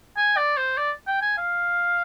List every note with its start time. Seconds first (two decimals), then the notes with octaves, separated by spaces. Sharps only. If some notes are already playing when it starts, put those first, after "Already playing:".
0.17 G#5
0.37 D5
0.57 C5
0.77 D5
1.07 G5
1.22 G#5
1.37 F5